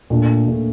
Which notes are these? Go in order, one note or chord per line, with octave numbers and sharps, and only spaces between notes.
A#2 A3 D4
A#2 A3 D4